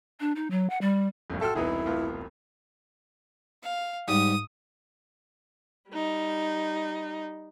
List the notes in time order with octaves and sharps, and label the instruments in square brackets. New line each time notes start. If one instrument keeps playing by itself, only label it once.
[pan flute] D4
D#4
F#3
F#5
G3
[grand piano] F#1 B1 A2 [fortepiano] F2
[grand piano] F#4 G5 A5 [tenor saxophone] A4 [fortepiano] E5 C6 F6
[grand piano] E1 C2 [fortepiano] B3 D#4 G#4 [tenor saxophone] E4
[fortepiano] A2 B3 F4
[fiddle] F5
[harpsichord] G#2 G3 [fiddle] D#6
[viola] G3 D#4